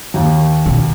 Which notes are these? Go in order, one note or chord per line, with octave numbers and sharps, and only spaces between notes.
D#2
B2